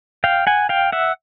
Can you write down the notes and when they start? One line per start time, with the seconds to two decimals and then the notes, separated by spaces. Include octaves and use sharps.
0.24 F5 G5
0.47 F#5 G#5
0.69 F5 G5
0.92 E5 F#5